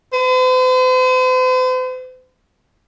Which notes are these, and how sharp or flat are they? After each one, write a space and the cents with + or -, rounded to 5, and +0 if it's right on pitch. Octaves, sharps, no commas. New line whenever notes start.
C5 -45